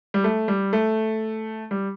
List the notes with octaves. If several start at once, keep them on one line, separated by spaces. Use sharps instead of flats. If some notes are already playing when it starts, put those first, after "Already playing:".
G3
A3
G3
A3
G3